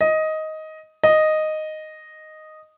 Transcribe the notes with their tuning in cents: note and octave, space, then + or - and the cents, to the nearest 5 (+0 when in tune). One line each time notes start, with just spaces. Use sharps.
D#5 +10
D#5 -5